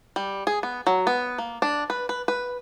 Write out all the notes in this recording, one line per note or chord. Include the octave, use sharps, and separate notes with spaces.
G3
G#4
B3
F#3
B3
A#3
D4
B4
B4
B4